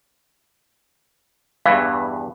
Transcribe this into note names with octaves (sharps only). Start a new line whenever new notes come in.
E2 G2 E3 F5